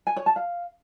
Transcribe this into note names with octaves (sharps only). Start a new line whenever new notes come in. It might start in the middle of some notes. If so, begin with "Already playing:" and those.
G#5
C#5
A5
F5